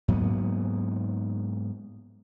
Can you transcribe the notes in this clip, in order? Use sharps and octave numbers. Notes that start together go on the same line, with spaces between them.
G#2 F#3 A#3 B3